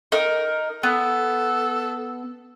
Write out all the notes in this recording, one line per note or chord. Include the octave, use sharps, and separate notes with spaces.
D#4 A#4
B3 A4